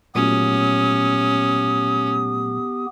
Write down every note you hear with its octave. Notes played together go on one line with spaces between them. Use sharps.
A#2 F#3 A3 B3 C#4 G4 D#6